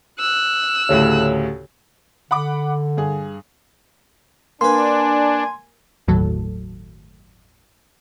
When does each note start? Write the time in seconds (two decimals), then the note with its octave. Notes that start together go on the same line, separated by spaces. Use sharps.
0.20 E6 F#6
0.89 D2 A2 C#3 G4 A4 C#5
2.31 D3 F#5 B5 D6
2.97 G2 G#4
4.61 A#3 D4 B4 G#5 C6
6.07 G1 D#2 A2 F#3 A4